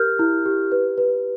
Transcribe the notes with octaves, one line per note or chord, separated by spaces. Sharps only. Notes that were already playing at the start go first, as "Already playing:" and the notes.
Already playing: G4 A#4 F6 G6
E4
G4
B4
B4